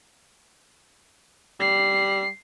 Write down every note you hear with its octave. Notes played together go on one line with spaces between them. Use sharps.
G3 C7